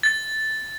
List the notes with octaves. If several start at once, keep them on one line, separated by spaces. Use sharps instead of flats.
A6